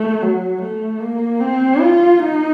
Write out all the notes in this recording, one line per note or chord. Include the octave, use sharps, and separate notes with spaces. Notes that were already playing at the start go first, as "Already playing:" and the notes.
Already playing: A3
F#3
A3
A#3
C4
F4
D#4